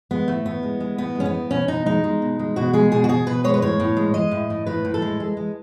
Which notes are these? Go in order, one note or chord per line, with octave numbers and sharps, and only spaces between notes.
G#3 B3
A2 A3
A2 B3
G#3
G#3
A2 B3
G#3 C#4
B3
A2
B2 C#4
B2 D#4
G#3 D#4
G#3
B2
G#3
B2 F#4
G#3 G#4
B2 G#4
F#4
B2 G#4
B2 B4
G#3 C#5
B4
A2 C#5
A2
G#3
G#3 D#5
A2
A2
A2 B4
A2
A4
G#3
G#3
G#3